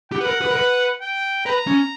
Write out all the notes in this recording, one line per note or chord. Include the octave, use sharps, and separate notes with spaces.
G4 F#5
B4
A#4
B4
A#4
B4
G5
B4 A#5
C#4